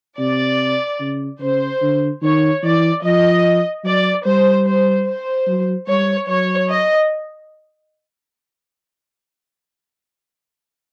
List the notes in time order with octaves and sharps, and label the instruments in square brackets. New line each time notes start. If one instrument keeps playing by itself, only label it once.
[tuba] C3 [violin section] D5
[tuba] C#3
[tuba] C#3 [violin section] C5
[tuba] D3
[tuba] D#3 [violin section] C#5
[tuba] E3 [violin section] D5
[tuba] F3 [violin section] D#5
[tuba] F#3 [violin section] D5
[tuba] G3 [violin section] C5
[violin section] C5
C5
[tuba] F#3
[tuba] G3 [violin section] C#5
[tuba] F#3 [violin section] C#5
[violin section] D#5